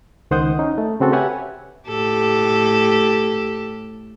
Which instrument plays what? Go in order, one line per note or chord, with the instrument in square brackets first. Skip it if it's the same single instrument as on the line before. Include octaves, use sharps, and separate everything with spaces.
[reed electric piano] C#2 D#3 C5 F#5 D#6 G6
C#4 D#4
A3
C#3 C4 F#4 A4
G4 B4 C#5 E5 F#5 G#5
[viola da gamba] A2 G4 A4